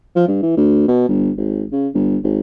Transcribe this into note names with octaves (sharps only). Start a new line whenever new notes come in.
F3
G2
E3
D2
B2
G1
G#1
C#3
G1
G#1